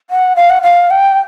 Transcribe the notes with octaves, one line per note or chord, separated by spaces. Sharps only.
F#5
F5
F#5
F5
G5